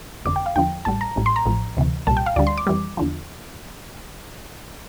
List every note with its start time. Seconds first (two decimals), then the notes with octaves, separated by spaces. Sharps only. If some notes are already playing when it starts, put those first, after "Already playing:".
0.25 G1 F2 D3 D6
0.36 G5
0.46 F5
0.56 E2 D3 F3 G5
0.85 A1 A2 G3 A5
1.01 A#5
1.16 A1 A2 G3
1.26 C6
1.36 A#5
1.46 A1 A2 F3
1.77 D2 C3 E3
2.07 C2 A#2 G3 A5
2.17 G5
2.26 F5
2.36 D2 D3 G3 D5
2.47 C6
2.58 D6
2.67 F2 E3 G3
2.97 E2 D3 F3